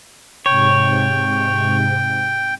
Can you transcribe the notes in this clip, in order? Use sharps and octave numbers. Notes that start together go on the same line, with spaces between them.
G#2 C3 C#5 G5